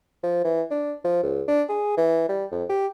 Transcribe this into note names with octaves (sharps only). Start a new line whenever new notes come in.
F3
E3
D4
F3
C#2
D4
G#4
E3
G3
F2
G4